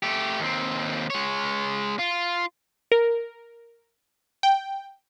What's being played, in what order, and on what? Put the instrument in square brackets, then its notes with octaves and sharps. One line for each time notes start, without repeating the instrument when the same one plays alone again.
[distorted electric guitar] A3 G4
D#2 C4
G#3 C#5
F4
[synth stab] A#4
G5